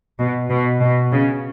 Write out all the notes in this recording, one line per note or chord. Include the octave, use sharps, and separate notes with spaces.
B2
B2
B2
C#3